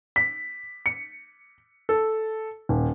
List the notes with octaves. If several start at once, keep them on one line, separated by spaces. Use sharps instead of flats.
B6
C#7
A4
D#1